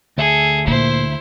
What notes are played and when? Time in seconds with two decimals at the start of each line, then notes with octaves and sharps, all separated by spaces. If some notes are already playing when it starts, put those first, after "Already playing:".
0.18 D2 G#4 A4 E5
0.67 A#2 E4 C5